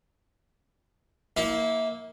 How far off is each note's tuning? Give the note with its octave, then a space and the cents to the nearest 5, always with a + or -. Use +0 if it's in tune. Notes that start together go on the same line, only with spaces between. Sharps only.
A#3 +0 E4 -30